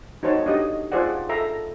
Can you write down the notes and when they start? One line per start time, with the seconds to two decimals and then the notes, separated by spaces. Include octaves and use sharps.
0.23 D#4 F#4 C5 C#5 A5
0.46 D4 D#4 G4 D#5 D#6
0.92 F4 G#4 C5 D5 F#5
1.29 A4 E5 A#5